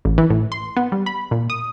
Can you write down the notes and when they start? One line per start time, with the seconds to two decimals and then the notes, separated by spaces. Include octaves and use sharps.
0.05 A1
0.18 E3
0.30 A2
0.52 C6
0.77 B3
0.92 G3
1.06 B5
1.31 A#2
1.50 D#6